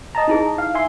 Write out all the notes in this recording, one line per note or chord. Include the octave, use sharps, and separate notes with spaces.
D#5 A5 A#5
D#4 E4 G#4
F5
E5 G#5 C6